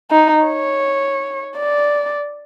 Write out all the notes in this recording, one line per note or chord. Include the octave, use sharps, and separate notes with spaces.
D#4
C#5
D5